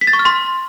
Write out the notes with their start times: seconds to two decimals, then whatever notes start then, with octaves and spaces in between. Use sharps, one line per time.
0.01 B6
0.07 A6
0.13 C#6
0.19 F6
0.25 C6